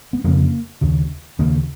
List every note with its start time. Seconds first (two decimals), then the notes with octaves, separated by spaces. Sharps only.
0.13 B3
0.24 F2 C#3 A#3
0.81 D#2 C#3
1.39 D#2 C#3 A#3